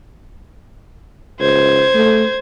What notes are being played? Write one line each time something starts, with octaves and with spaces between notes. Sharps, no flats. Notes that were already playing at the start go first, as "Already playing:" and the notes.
C#2 C5 G#6
A3